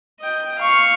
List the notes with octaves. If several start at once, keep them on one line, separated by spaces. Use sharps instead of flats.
D#5 G5
F5 C#6